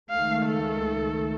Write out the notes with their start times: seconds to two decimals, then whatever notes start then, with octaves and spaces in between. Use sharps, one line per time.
0.10 C#2 D#3 A3 F5
0.47 A4